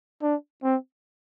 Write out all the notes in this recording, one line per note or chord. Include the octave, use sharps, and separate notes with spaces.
D4
C4